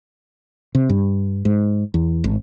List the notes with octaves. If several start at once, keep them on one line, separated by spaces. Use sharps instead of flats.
C3
G2
G#2
E2
G#1